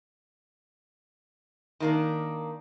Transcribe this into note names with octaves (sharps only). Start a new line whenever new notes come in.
D#3 A#3 D4